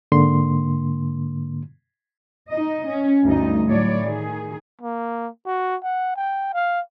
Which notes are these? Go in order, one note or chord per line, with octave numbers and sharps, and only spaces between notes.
G#2 D3 A#3 C6
D#4 D#5
C#4
D2 G2 D#4 D#5
A2 F#3 C#5 D5
D#3 G#4
A#3
F#4
F#5
G5
F5